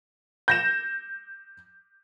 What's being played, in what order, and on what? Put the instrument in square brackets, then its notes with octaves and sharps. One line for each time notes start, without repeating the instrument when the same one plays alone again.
[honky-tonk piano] G6 A#6 E7